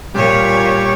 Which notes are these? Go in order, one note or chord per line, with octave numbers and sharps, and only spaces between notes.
A#2 G3 C#5